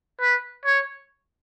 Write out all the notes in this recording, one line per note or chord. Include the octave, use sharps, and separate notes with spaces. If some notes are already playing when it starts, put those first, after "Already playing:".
B4
C#5